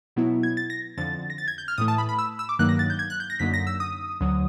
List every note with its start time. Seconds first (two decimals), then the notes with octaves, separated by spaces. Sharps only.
0.16 B2 F#3 B3 E4
0.43 G#6
0.57 A6
0.70 A#6
0.97 F2 D3 F3 A6
1.30 A#6
1.38 A6
1.48 G#6
1.58 G6
1.68 F6
1.78 A2 E3 A3 D#6
1.88 A5
1.98 B5
2.09 B5
2.19 E6
2.39 E6
2.49 D6
2.59 G2 D#3 F#3 A#3 D#4 F#6
2.69 A#6
2.79 A6
2.90 G6
2.99 G#6
3.10 F#6
3.20 G6
3.30 A#6
3.39 F#2 D3 F#3 A#3 D#4 B6
3.54 A#6
3.67 E6
3.80 D#6
4.21 D2 D3 F#3